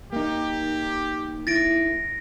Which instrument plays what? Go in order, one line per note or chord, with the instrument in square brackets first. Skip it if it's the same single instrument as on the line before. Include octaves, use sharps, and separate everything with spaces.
[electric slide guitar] A#3 D#4 [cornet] G4
[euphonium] E4 [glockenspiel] A6 A#6 D7